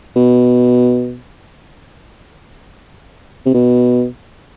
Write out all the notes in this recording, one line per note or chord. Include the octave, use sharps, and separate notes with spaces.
B2
C3
B2